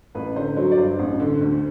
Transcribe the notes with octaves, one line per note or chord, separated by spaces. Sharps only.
A1 B4
D3 C5
F#3 C5
D5
G2 C5
A1
D3
D2